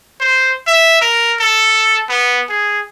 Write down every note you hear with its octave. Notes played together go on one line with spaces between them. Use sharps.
C5
E5
A#4
A4
B3
G#4